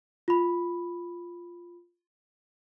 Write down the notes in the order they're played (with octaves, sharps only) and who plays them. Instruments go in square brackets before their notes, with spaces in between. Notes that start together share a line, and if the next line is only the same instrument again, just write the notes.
[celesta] F4 B5